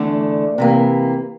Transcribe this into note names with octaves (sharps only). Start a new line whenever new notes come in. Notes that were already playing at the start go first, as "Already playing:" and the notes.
Already playing: E2 D3 A3 D5
C3 E3 A#3